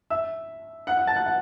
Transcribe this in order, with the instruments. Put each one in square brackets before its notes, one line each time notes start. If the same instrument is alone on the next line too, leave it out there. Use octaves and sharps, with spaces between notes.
[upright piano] E5 E6
F#5 F#6
F#5 F#6
A5 A6
F#5 F#6
F#5